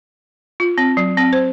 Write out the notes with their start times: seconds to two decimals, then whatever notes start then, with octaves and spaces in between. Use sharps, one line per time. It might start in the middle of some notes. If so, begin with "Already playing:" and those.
0.60 F4
0.78 C4
0.97 F#3
1.17 C4
1.33 C5